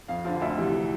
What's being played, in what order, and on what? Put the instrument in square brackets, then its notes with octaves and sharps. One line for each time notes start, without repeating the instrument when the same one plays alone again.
[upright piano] F2 F5
D3 F3 F5
D2 E5
C3 E3